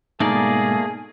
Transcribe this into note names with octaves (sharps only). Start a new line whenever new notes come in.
G#2 B2 A3 A#3 D#4 G#4 D5